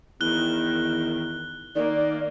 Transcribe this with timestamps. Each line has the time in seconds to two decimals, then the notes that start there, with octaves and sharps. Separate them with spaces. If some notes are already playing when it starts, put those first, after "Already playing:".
0.21 E2 D#3 F#6 G7
1.75 D#3 A#3 D5